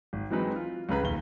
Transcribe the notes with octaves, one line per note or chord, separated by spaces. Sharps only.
G#1
E3 F#3 G#3 C4 D#4 B4
F4
C#2 C#3 B4 A#5
D#1 D#2 G7